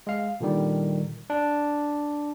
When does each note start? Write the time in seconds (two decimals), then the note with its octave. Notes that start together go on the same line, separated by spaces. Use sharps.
0.07 G#3 F5
0.40 A#2 D3 D#3 G3
1.30 D4